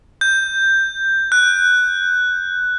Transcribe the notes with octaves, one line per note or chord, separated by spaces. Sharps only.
G6
F#6